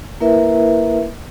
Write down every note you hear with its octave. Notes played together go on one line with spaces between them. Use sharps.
A#3 E4 A#4 B4 E5